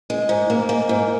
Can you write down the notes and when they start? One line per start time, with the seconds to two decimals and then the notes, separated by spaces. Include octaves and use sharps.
0.10 G#3
0.29 G#2
0.50 A#3
0.69 A#3
0.89 G#2